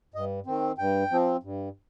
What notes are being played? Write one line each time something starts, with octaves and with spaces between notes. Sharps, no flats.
G2 D#5
D#3 C4
G2 G5
F3 C4
G2